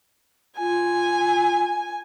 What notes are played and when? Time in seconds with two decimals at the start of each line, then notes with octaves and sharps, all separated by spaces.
0.58 F4 G#5